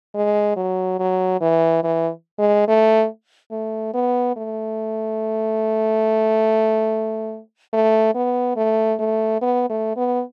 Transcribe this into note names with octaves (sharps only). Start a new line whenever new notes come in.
G#3
F#3
F#3
E3
E3
G#3
A3
A3
B3
A3
A3
B3
A3
A3
B3
A3
B3